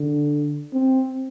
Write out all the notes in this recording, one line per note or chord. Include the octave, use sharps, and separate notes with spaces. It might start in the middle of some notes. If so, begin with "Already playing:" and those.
Already playing: D3
C4